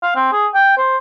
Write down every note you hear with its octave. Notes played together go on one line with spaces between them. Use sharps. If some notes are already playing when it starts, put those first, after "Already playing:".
F5
C4
G#4
G5
C5